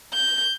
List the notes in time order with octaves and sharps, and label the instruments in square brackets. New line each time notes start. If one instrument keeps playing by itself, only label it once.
[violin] G6